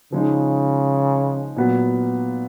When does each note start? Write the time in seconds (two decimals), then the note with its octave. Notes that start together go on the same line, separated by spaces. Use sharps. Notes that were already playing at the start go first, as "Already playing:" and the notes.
0.12 C#3 F3 G#3 D#4
1.56 A#2 F#3 B3